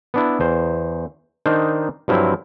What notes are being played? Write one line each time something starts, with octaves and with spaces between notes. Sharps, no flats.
B3 D4 E4
E2 C5
D#3 D4 D#4 C5
G2 F3 F#3 C4 E4